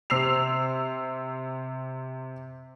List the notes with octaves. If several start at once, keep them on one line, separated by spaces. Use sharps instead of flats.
C3 E6 C7 F7